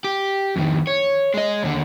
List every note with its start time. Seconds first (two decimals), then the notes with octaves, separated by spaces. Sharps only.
0.04 G4
0.56 F2 D#3
0.87 C#5
1.34 G#3 D#5
1.63 D#2 D3